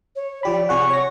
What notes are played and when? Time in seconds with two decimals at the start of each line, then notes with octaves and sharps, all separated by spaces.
0.16 C#5
0.43 F3 G4 D5 B5
0.69 C3 G#4 F#5 C#6
0.90 C#5 A#6